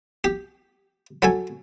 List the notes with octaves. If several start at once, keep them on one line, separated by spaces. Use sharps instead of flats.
G4
F#3 A4 G#5